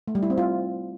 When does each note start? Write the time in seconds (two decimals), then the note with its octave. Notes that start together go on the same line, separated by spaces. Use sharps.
0.08 A3
0.15 G3
0.23 E4
0.30 C4
0.38 F4